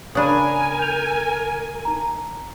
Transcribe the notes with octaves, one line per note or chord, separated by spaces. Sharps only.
C#3 D4 A#4 G#5 B5 D#6
G6 F7
D#4 A#5